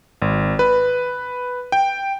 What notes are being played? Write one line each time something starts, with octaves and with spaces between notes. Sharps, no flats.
G#1
B4
G5